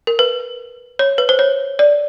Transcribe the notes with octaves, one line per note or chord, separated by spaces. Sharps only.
A#4
B4
C#5
B4
C5
C#5
D5